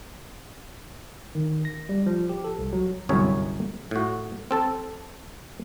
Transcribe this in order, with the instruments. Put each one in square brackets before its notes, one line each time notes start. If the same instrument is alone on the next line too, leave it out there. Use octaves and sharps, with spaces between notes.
[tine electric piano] D#3
A#6
G3
F3
G4
A4
C2
F#3
[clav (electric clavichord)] G1 C2 F#2 G#4 C#5
A2 F#4
C4 A4 A5